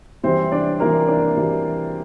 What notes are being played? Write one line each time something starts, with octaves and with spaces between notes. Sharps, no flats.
C3 E3 G3 C4 C5
D4 D5
C3 E3 G3 A#3 A#4
D4 D5
C3 E3 G3